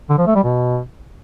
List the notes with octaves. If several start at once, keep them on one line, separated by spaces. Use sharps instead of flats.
D3
F3
A3
G3
B2